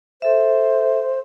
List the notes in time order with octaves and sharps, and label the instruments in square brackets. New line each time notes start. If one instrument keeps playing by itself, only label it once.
[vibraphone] A4 E5 [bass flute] C5